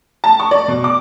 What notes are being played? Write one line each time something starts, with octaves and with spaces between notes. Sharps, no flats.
A5
C#6
D5
B2
D6